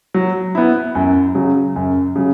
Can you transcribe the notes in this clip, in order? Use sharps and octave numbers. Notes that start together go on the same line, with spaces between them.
F#3
B3 E4
F#2
C#3 F#3
F#2
C#3 F#3